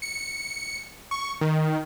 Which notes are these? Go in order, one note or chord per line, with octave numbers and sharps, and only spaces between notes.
C#7
C#6
D#3